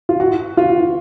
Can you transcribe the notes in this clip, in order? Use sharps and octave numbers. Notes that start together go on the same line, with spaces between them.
F4
F#4
F4